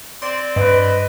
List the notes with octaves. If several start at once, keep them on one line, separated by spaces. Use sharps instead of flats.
C4 D5 C6
G2 B4 D#5